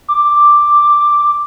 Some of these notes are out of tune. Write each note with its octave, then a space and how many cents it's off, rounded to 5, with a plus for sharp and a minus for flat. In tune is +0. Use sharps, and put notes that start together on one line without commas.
D6 +5